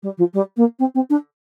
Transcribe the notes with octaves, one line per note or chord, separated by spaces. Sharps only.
G3
F3
G3
A#3
C4
C4
D4